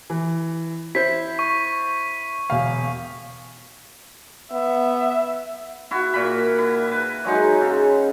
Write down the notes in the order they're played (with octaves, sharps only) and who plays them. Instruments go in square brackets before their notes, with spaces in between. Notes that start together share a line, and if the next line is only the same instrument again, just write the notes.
[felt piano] E3
[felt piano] E4 C5 [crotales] B6
[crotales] C#6
[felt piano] E1 F5
[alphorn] B3 [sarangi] E5
[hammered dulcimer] E4 F#4
A#2 B5
E4
B4
F#3 G#3 D#4
C#3